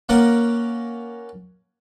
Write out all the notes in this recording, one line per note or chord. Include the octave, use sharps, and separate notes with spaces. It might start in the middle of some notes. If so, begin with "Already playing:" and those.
A#3 C#4 A#4 D5 F#5 A#5